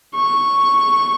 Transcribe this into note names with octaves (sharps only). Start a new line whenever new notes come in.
C#6